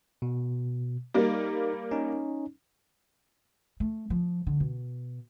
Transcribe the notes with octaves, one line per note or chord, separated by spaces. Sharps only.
B2
G3 A#3 D#4
C#4 D#4
A3
F3
D3
B2